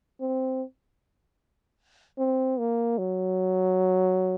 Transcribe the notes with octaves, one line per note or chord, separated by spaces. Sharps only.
C4
C4
A#3
F#3